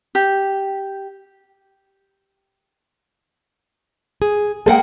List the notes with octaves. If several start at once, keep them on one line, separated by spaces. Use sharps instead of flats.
G4
G#4
G#3 A#3 A4 F#5 G5